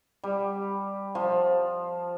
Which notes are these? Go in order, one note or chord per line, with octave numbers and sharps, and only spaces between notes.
G3
F3